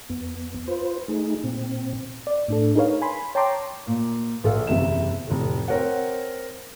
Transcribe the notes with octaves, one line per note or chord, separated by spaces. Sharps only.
F2 B3
F4 B4 C5
A3 D#4 G#4
A#2 C4
D5
A2 D4 A4
D#4 G#4 A#4 B4 C#5 F5
G#5 B5 C6
C#5 G5 A5 A#5 C6 D6
A#2
A#1 A4 F5
F#1 E2 C3 E5 E7
F1 A2
C4 A#4 C#5 F#5